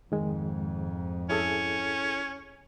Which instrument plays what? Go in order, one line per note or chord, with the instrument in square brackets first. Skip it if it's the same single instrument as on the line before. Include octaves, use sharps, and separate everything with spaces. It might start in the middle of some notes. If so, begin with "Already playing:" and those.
[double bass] F2 G#2 [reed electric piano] D#3 G#3
[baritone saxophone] C#4 [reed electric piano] E4 G#4 A4